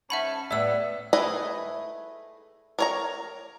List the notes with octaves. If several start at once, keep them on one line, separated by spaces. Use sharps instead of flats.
G#2 C#4 E5 F#5 A5 B5
A2 G3 B3 C#5 E5 E6
A3 E4 G#4 B4 D#5
A#4 C#5 A#5